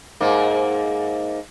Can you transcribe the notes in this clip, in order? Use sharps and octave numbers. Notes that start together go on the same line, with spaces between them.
G#2 A#3